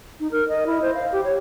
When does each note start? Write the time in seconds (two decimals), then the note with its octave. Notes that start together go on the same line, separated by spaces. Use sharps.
0.20 D#4
0.31 A#4
0.48 D#5
0.66 E4
0.82 C5
0.94 F5
1.12 G4
1.24 C#5